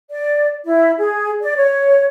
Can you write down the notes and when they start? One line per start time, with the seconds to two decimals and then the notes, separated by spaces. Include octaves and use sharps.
0.11 D5
0.66 E4
0.99 G#4
1.43 D5
1.56 C#5